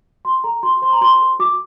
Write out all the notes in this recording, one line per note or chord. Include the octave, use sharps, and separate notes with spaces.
F#4 C6
A4 A#5
F#4 C6
C5 C6
A#5
F#4 C6
A4
F#4 D6